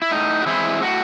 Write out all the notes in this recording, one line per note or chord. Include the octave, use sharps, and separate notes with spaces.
E4
A2 D#4
F#4
E3 G#3 C4 E4
A2 F#4